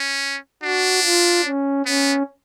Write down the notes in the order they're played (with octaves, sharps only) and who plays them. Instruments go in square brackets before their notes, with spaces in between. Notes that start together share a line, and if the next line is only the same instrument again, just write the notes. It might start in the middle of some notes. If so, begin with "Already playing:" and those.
Already playing: [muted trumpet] C#4
[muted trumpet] D4 [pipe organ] F#4
[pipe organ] F4
C#4
[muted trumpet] B3 [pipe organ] C#4